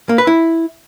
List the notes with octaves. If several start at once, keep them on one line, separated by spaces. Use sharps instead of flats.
A#3
B4
E4